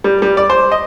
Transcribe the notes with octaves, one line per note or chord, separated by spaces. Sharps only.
G3
G3
D5
C5
D#5